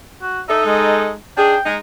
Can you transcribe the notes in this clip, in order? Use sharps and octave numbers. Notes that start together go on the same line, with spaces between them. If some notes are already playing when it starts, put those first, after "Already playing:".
F#4
D#4 A4 E5
G#3
D4 D#4 G#4 G5
G#3 D#4